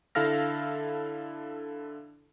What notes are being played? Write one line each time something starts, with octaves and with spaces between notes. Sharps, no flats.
D3 E4 A4 F5 F6 A#6